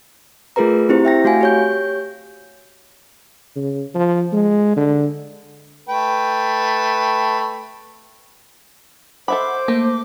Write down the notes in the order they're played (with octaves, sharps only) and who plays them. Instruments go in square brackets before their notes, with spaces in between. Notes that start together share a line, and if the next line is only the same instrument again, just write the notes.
[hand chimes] A3 F4 G#4 A#4 B4 A#5
C4 E4 G4 C5
E5 G5 A#6
A3 F#4 F5 G#5
G4 C#5 G6
[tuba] C#3
F3
G#3
D3
[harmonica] A3 B4 G5
[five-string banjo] A4 E5 B5 [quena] C5 [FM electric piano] D#5 F#5 [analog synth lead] D6
[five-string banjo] A3 [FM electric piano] A#3